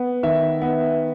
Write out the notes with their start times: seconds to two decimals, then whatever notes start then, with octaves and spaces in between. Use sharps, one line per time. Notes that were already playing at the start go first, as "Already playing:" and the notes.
Already playing: B3
0.23 D#3 E5
0.62 B3